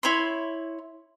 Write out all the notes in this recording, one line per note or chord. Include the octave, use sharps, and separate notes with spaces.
E4 C#5 B5 C6